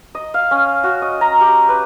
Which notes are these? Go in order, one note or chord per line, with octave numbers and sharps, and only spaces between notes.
D#5
F5
C#4
F#4
D#5
A#5
G4
B4